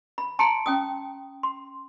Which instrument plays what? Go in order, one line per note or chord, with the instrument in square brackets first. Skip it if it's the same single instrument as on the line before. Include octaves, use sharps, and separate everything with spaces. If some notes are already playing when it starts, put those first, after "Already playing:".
[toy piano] B5
[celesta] A5 C#7 D7 [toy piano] A#5 C6
[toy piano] C#4 G5 D#6
[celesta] C6